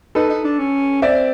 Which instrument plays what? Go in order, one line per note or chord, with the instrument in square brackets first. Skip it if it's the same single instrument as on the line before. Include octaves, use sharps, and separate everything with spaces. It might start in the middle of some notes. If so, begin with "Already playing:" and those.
[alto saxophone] D#4 [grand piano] A4 B4
[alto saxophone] D#4
D4
C#4
[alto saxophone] C4 [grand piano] D5 E5